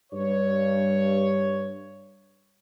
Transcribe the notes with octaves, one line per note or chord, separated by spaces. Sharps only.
G2 C#5